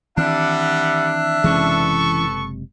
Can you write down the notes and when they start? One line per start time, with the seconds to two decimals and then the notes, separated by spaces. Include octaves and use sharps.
0.18 D#3 E3 G3 C4 D4 E5 F#5
1.44 F#1 C3 E3 G#3 C#4 A4 B4 C#6